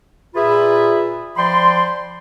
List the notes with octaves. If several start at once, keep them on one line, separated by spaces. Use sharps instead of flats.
A#2 F4 G#4 B4 E5 B5
F3 D5 G5 B5 C6